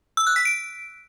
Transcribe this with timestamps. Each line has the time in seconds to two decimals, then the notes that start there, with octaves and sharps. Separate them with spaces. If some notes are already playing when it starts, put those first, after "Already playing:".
0.17 E6
0.27 F#6
0.36 B6
0.45 D7